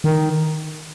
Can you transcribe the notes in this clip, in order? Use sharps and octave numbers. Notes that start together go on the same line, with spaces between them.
D#3